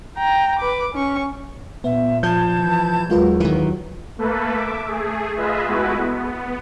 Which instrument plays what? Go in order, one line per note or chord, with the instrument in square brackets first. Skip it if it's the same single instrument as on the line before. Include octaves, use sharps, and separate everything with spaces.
[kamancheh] G5 A#5
B4 D6
C#4 C#6
[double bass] A#2 [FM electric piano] B3 [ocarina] E5
[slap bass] F3 [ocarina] A5 [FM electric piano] G6 G#6
[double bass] E3
[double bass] D#2 F#3 [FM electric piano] G#3 F4 B4 [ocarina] A#4
[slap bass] D#3 E3
[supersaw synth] A3 A#3 A4 B4
E5 D6
A3 G#4
F4 G#4 B4 D#5 E5
G#3 A3 B3 E4 F#4 B4
B3